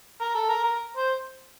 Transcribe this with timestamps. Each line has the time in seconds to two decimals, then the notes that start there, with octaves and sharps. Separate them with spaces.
0.21 A#4
0.35 A4
0.49 A#4
0.63 A#4
0.97 C5